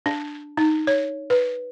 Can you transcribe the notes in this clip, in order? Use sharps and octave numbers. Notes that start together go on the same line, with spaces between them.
D4
D#4
C#5
B4